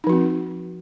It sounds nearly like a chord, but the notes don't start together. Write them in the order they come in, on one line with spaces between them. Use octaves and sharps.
D#4 F3 F#4 C4